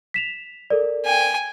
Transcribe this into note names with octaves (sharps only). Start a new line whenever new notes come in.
B6 E7 F7
A4 A#4 D5
G5 G#5